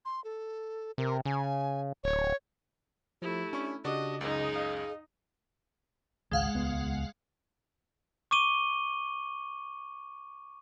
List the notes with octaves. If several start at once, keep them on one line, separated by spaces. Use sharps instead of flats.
C6
A4
C3 A#4
C#3 G#5
D1 C#5
F3 A3 E4 G4
C#4 D4 C#6
C#3 D4 F#4 G4 D#5 D6
C#2 F#2 D#4 G#4 D#5
F5
G#1 C#2 G#3 F5 F#5
D#1 C#2 B3
C#6 D6 D#7 G7